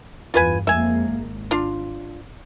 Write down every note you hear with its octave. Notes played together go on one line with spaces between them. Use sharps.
E2 G2 F4 B4 G#5
F2 G#3 A#3 E5 G#5
G#1
D4 F4